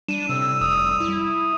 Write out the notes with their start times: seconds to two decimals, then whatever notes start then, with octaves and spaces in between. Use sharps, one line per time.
0.09 G3 D4 D#7 E7
0.29 A2 C3 E6
0.61 F1 D#6
1.00 E4